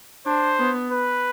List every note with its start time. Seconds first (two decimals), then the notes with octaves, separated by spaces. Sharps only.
0.26 D4 C5
0.60 B3
0.91 B4